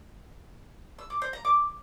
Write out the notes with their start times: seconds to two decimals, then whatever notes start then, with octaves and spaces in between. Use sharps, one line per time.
0.99 E6
1.10 D6
1.22 C5
1.33 A#5
1.45 D6